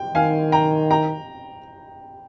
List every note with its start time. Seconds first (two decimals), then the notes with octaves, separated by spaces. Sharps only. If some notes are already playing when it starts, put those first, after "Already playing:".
Already playing: G5
0.15 D#3 F5 G#5
0.52 G5 A#5
0.91 G5 A#5